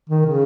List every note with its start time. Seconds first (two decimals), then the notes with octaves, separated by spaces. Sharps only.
0.09 D#3
0.26 C#3